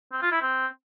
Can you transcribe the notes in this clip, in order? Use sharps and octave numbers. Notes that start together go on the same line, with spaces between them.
C4
F4
E4
C4